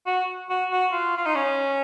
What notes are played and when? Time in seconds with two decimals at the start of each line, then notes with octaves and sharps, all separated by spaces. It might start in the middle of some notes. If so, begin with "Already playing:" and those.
0.07 F#4
0.50 F#4
0.71 F#4
0.92 F4
1.17 F4
1.26 D#4
1.35 C#4